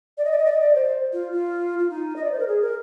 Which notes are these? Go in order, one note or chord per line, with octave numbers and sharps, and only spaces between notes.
D5
D#5
D5
D#5
D5
D#5
D5
C5
F4
F4
F4
D#4
D#5
D5
C5
A#4
G#4
A#4